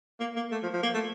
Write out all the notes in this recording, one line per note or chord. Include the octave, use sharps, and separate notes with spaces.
A#3
A#3
A3
F3
F3
A#3
A3